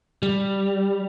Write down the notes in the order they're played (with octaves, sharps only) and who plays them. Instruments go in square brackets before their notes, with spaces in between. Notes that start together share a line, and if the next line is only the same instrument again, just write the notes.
[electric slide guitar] G3